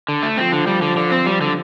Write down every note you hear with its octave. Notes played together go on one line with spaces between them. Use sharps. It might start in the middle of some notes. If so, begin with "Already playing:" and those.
D3
A3
F3 C4
D3
G3
D3
D3
C4
G3
D3